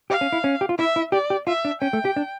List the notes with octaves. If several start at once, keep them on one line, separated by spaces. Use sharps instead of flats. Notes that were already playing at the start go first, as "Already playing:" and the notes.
G4 F5
C#4
E4
C#4
G4
F4
E4 E5
E4
G4 D5
G4
F4 E5
D4
C#4 G5
A3
G4
D4